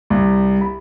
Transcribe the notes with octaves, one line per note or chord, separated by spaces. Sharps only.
C2
B5